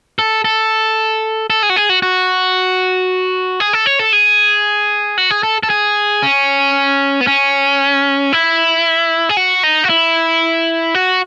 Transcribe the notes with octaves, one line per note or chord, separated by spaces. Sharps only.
A4
A4
A4
G#4
F#4
G#4
F#4
F#4
G#4
A4
C#5
A4
G#4
F#4
G#4
A4
A4
G#4
C#4
B3
C#4
E4
G#4
F#4
D#4
F#4
E4
F#4